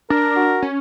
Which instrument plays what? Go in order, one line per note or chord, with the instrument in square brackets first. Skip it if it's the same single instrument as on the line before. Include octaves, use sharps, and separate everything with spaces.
[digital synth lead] D4 [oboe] A#4
[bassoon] F#4
[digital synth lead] C#4